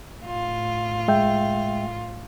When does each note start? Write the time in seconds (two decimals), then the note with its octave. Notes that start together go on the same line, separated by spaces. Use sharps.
0.24 A2 F4
1.08 G#3 E5 G5